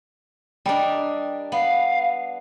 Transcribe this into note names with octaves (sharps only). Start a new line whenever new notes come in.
G3 D4 G4 A#4 D#5
B3 F5